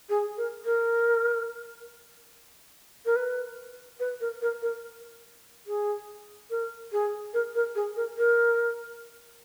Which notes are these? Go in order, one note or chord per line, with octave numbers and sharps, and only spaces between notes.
G#4
A#4
A#4
A#4
B4
B4
A#4
A#4
A#4
G#4
A#4
G#4
A#4
A#4
G#4
A#4
A#4